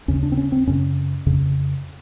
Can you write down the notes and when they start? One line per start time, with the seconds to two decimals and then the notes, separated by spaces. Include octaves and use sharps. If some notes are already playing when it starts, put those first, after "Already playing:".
0.08 D#2 C#3 C#4
0.23 D4
0.32 C4
0.37 C#4
0.52 C4
0.67 F#2 C#3 C#4
1.26 F2 C#3